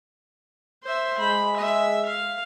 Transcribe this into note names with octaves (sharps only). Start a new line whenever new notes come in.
C5 E5
G#3 B5
E5
F5